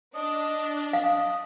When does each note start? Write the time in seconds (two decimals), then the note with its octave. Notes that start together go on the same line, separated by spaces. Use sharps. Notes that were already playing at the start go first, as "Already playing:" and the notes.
0.15 D4 D#5
0.93 D#5 F5